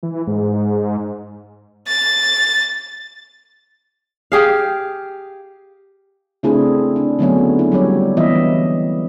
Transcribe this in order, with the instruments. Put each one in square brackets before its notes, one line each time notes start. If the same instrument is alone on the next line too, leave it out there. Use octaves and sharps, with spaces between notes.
[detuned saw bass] E3
G#2
[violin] A6
[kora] G4 G#4 F5
[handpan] C#3 A3 C4 D4 E4 G#4
D4
D3 F#3 A3 B3 C#4
E4
F#3 G3 G4 C#5
E3 B3 D#5 E5